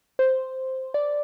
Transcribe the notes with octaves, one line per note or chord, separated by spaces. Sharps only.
C5
D5